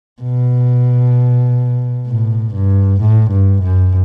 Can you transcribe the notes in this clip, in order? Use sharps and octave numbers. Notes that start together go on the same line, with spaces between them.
B2
A2
G2
A2
G2
F#2